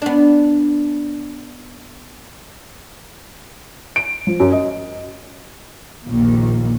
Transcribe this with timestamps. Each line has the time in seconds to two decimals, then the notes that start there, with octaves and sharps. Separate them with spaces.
0.02 B3 D4
3.96 D7
4.27 F3
4.40 F#2
4.52 D#5
6.05 A#1 D#2 A#2